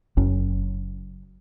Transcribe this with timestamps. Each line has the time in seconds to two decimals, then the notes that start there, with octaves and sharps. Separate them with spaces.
0.17 F#1 F#2